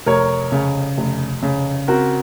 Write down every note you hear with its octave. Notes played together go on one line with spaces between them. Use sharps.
F1 A#4 C#5
C#3
F1
C#3
C4 F#4 A#4